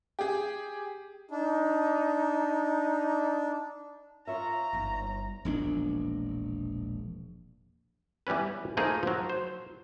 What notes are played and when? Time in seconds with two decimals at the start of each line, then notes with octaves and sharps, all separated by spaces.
0.19 G4 G#4
1.31 D4 D#4
4.27 F4 C#5 E5 A#5
4.73 G1 D#4
5.45 E1 A#1 C4 D4
8.27 E3 G3 B3 C#4 B4
8.77 F3 A3 A#3 D#4 G#4
9.03 F3 F#3
9.29 C5